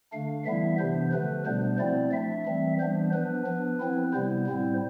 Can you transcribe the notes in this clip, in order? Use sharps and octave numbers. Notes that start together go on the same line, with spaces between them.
D3 A3 D4 F5
E3 G3 B3 E4 E5
C3 E3 B3 D4 C5
D3 F3 A3 B4
B2 G3 B3 D4 C5
F3 A3 C4 E4 D5
F3 A3 D4 E5
E3 G3 C4
E3 G3 B3 D4 C5
F3 B3 D4 B4
F3 B3 D4
F3 C4 E4
C3 G3 B3 E4 C5
A2 G3 C4 E4